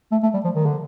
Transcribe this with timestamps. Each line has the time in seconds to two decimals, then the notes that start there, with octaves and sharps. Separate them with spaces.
0.12 A3
0.23 A3
0.34 G3
0.44 F3
0.55 D#3
0.66 D3